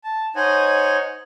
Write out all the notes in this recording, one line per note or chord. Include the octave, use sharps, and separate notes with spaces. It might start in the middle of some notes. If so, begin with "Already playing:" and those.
A5
D#4 C5 C#5 D#5 F#5 G#5